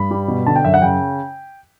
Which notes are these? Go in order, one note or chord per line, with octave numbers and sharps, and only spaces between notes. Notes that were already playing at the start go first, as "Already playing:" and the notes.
Already playing: G2 B5
G3
B2
D3 A5
G5
F#2 E5
F#5
C#3 G5